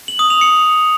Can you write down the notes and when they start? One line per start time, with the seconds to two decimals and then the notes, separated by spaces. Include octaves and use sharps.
0.08 F#7
0.19 D#6
0.30 F7
0.41 C#7